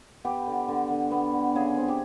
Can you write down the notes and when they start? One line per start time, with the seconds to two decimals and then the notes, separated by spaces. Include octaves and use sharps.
0.25 B3 G4
0.47 D3
0.68 D3
0.90 D3
1.11 B3
1.33 D3
1.55 C#3 G#4
1.77 C4
1.88 G4